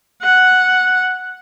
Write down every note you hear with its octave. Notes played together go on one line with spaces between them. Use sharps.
F#5